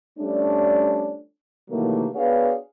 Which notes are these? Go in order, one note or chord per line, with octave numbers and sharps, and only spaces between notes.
F3 G3 A3 C#4 D4
C3 D#3 E3 F#3 A3 A#3
B3 D4 F#4 G#4 C#5 F5